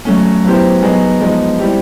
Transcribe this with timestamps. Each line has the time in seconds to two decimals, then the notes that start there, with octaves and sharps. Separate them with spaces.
0.05 F#3 A3 C#4
0.44 F#3 B3 E4 G4 C5
0.82 F#3 B3 D#4 G#4
1.21 F3 G#3 B3 D#4
1.59 G3 C4 E4 G4